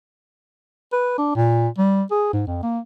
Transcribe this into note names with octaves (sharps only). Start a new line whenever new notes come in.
B4
D4
A#2
G3
G#4
G#2
F2
A#3